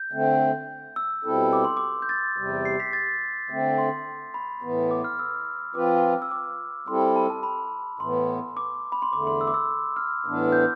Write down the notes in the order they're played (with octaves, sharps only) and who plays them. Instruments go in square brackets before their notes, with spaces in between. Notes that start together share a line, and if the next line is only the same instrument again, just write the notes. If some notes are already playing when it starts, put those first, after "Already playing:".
Already playing: [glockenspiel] G6
[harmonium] D3 A3 C4
[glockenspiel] E6
[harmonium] B2 G3 C4 E4 A4
[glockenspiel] D6
C6
D6
G6
A6
[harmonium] E2 C3 G3
[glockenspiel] C7
B6
A6
[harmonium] D3 A3 C4
[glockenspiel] C6
B5
[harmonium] A2 E3 B3
[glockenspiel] D6
F6
E6
[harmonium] F3 C4 F4 B4 [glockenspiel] D6
[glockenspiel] E6
D6
[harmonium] G3 C4 E4 A4 [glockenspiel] C6
[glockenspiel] B5
A5
A5
B5
[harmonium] A2 E3 B3 [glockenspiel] C6
[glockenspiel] D6
B5
C6
[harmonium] E2 D3 A3 [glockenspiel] D6
[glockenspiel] C6
E6
D6
E6
F6
[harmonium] A2 E3 B3 D4
[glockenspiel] G6